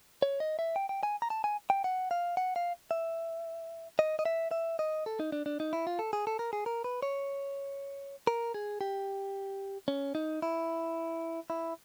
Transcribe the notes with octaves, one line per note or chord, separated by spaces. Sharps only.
C#5
D#5
E5
G5
G5
G#5
A#5
A5
G#5
G5
F#5
F5
F#5
F5
E5
D#5
D#5
E5
E5
D#5
A4
D#4
D4
D4
D#4
E4
F4
A4
G#4
A4
A#4
G#4
A#4
B4
C#5
A#4
G#4
G4
C#4
D#4
E4
E4